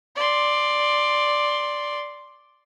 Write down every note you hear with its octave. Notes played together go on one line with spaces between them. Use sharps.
D5 C6